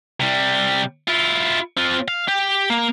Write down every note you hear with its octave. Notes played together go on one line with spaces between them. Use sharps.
C3 G3
E4 F4
C4 F4
F5
G4
A#3